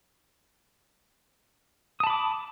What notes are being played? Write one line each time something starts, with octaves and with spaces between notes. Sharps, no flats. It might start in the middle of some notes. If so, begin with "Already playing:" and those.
A5 B5 D6 D#6